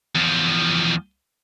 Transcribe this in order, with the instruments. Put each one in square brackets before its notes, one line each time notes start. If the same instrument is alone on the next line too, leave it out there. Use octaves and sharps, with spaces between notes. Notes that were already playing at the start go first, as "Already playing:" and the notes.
[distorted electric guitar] E2 F3